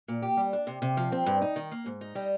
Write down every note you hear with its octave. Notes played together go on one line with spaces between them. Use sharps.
A#2
G4
G3
D4
C3
C3
F3
C4
G2
D#4
D#3
A#3
G#2
D#4
G3